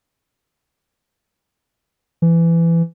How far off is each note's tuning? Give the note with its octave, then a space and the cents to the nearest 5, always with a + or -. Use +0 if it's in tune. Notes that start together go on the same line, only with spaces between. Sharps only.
E3 +20